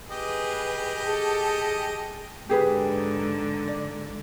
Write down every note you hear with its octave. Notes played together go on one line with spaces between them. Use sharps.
G4 G#4 B4 D#5
G#4 A4
G#2 D3 G4 G#4 B4
D5